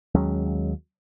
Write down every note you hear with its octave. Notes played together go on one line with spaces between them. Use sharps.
D#2 F#3 G#3 C#4